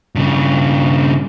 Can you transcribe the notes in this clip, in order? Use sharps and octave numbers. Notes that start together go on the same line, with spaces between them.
G2 C#3